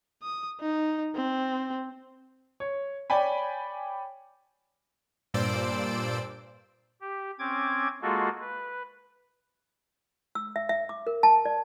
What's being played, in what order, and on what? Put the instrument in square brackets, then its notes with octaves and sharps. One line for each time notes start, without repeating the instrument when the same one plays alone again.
[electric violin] D#6
D#4
C4
[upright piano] C#5
C#5 D5 G5 G#5 B5
[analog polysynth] G2 A#2 C5 D5 E6 D7
[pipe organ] G4
C4 C#4 D6 G#6
G#3 A#3 F4 F#4 G#4 A4
B4
[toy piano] E6
E5
E5
D6
A#4
A5
D5